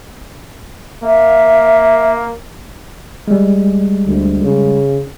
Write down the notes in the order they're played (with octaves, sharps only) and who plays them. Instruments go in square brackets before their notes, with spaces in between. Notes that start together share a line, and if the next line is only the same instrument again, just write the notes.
[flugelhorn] A#3 [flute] E5
[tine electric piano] G3 G#3
[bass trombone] D2
C#3